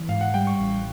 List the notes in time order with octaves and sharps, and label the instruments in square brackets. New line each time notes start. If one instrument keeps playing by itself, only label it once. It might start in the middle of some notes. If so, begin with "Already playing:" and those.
Already playing: [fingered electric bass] E3
[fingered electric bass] G#2 [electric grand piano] F5
[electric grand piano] F#5
[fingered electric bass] G3 [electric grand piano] G5
[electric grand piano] C#6
[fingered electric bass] A1